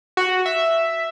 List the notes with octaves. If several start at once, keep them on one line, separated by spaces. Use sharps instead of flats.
F#4
E5